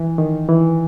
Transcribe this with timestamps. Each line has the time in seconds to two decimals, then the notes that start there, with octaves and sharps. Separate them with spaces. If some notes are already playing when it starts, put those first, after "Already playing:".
Already playing: E3
0.18 D#3
0.49 E3